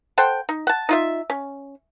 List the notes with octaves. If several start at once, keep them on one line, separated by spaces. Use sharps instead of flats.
A4 C5 F#5 G5
D#4
F#5 A5
D#4 F4 E5
C#4